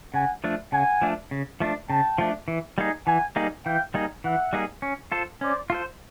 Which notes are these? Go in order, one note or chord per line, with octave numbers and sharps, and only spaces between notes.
C#3 F#5 G#5
F3 A3 D4
C#3 F#5 G#5
F3 A3 D4
C#3
F3 A3 D4
C#3 G5 A5
F3 A3 D4
E3
G3 A#3 D#4 G#4
E3 F#5 G#5
G3 A#3 D#4 G#4
E3 F5 G5
G3 A#3 D#4 G#4
E3 E5 F#5
G3 A#3 D#4 G#4
C#4
F4 A4 C5
C#4 C5 D5
F4 A4 C5